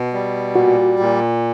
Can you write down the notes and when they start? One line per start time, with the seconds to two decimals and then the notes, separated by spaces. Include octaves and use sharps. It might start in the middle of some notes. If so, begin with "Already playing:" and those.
Already playing: B2
0.13 G3
0.55 A#2 F#4
1.00 A#2